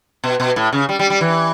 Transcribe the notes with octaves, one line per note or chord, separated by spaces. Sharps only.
B2
B2
A2
C#3
G3
G3
G3
E3